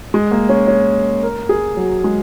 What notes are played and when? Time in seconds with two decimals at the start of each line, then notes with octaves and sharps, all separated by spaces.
0.14 G#3
0.32 A#3
0.49 C#4
0.67 C#4
1.23 A#4
1.49 G#4
1.77 F#3
2.04 G#3